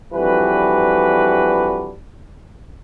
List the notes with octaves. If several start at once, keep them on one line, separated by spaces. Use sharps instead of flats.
F2 E3 G3 D4 F#4 B4